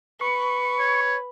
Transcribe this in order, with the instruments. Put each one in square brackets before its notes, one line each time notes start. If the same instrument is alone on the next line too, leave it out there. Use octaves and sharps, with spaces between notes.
[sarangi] B4 [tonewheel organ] C#6
[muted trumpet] C#5